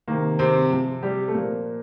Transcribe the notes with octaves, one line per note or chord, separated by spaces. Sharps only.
C3 D#3 A#3
C3 C4
C3 F3
G3 G4
A3
A#2 F3 A#3